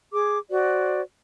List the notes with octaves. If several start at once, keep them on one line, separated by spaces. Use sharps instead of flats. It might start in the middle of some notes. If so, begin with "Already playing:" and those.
G#4 D6
F#4 C5 D5